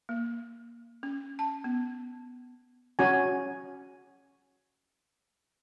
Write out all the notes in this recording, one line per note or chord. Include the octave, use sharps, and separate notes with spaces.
A#3
C#4
A5
B3
C#4 F#4 G#5